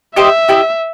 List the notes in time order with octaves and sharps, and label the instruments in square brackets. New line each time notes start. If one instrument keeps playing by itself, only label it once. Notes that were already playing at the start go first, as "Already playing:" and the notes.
[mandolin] D#4 G4 C5 D#5 [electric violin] E5
[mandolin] E4 G4 D#5